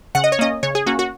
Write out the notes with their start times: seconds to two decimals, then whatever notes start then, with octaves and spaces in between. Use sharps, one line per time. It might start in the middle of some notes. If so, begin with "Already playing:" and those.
0.15 C#3 F#5
0.24 D#5
0.32 C#5
0.39 A#3 C#4 D#5
0.63 C#3 C#5
0.75 G#4
0.86 A#3 C#4 F#4
0.99 F#4